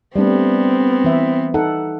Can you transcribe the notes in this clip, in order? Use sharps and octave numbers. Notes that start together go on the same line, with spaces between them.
G3 A3 B3 C4 D4
E3 E5
D#4 A4 F#5